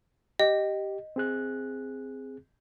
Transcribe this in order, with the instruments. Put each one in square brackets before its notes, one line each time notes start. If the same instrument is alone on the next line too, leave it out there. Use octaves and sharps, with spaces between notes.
[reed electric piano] G4 [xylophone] D#5
[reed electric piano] C4 G#4 F#6